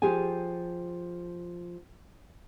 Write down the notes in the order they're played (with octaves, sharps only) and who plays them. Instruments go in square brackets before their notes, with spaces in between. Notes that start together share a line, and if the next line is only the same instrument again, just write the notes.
[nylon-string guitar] F3 G4 G#4 G#5